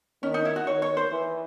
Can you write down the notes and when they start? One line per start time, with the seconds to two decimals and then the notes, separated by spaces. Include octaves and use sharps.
0.23 D#3 C#4
0.34 D#4
0.45 E4
0.56 F#4
0.67 D#3 C#5
0.82 C#5
0.97 C5
1.12 E3